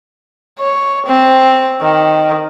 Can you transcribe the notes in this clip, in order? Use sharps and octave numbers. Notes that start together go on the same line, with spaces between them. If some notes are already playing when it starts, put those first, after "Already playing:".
C#5
C4
D#3